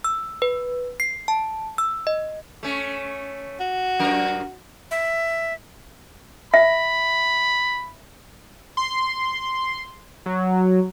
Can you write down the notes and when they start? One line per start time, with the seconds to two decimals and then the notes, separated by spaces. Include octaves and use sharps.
0.04 E6
0.42 B4
1.00 C7
1.28 A5
1.78 E6
2.07 D#5
2.63 A3 C#4
3.60 F#4
3.99 F#2 A#4
4.91 E5
6.54 E5 B5
8.77 C6
10.26 F#3